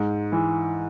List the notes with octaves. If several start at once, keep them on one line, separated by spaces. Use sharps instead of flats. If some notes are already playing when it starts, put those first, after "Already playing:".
Already playing: G#2
E3